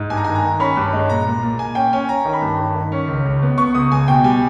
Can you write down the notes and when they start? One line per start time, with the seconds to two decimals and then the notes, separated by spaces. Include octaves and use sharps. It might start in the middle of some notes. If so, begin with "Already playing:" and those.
Already playing: G#2
0.10 G2 G#5
0.17 A#5
0.24 D#3 G#5
0.35 A#5
0.43 D#3
0.60 C#4 B5
0.77 G2
0.93 G#3
1.09 A#2 A#5
1.26 A#2
1.43 A#2
1.59 A#2 G#5
1.75 C#4 G5
1.93 C#4 G#5
2.09 C#4 A#5
2.25 D#3
2.33 B5
2.41 G2
2.58 D#3
2.75 D#3
2.92 C#4
3.08 C#2
3.26 C#2
3.42 B3
3.58 B3 C#6
3.75 C#2 D#6
3.91 C#2 G#5
4.08 B2 G5
4.24 G3 G#5